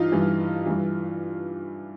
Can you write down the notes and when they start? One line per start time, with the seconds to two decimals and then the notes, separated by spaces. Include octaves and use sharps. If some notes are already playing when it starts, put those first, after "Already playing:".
Already playing: G2 E3 D#4 F4
0.12 G2 E3
0.66 G2 E3